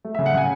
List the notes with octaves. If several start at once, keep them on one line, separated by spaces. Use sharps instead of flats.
A3
E5
C#3
F#5
C#3 G#5